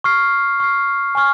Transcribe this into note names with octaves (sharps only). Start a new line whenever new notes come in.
C#6 F6 C7
C#6 F6 C7
G#5 C#6 F6